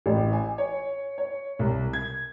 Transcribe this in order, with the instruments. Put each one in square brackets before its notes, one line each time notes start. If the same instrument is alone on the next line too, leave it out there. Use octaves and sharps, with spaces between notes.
[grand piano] A1
G#5
C#5
C#5
C2
G#6